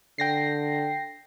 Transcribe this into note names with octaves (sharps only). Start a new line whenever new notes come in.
D3 G5 A#6 C7